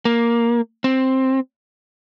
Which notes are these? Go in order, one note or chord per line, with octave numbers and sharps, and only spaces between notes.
A#3
C4